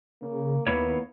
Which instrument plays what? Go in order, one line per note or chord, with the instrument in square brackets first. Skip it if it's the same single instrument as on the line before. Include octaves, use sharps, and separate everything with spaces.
[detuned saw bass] C#3 [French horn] A#3
[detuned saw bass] D#2 [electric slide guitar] A#3 E4 C#5 [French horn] B3